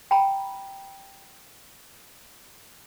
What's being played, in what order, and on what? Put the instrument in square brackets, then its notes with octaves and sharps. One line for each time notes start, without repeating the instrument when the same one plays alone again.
[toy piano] G5 A#5 B5